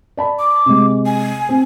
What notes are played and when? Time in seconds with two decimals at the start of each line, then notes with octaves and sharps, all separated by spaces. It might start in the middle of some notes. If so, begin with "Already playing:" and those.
0.17 D5 A5 B5
0.39 D6
0.66 C3 G#3
1.06 G#5
1.49 C4